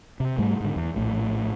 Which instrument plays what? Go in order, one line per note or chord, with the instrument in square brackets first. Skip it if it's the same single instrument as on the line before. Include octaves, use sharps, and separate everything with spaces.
[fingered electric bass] C3
G#2 G3 A3
G#2 D3
E2
A#1 A2